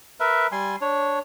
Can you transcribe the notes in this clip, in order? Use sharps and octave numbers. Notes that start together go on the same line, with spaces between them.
A#4 B4 E5
G3 G#5 C6
D4 C#5